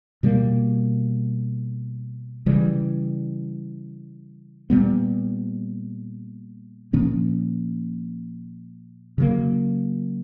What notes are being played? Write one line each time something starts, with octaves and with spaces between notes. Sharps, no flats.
B2 G3 A#3
C#3 E3 G3
A#2 G3 B3
A#2 F3 A#3 C#4
C#3 F#3 A#3